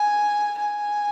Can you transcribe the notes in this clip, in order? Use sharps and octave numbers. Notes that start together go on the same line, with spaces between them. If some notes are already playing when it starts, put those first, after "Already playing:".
Already playing: G#5
G#5